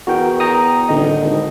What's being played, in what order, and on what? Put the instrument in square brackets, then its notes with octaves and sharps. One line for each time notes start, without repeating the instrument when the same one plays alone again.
[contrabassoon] E2 [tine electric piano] F#4 A#4 G5
[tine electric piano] G5 A#5 D#6
[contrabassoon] D#1 [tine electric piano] A1 D3 D#5
[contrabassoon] G#1